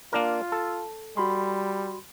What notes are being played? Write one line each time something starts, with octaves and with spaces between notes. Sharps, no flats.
A#3 D4 F4 A#4
A4
G3 F#4 B5 C6